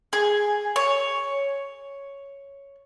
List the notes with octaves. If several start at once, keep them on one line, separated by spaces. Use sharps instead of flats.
G#4
C#5